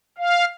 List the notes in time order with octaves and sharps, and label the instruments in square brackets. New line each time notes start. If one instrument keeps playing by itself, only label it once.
[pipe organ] F5